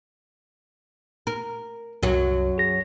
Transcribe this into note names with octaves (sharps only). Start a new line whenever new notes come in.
A#4
C2 F#2 F#3
G#4 A#6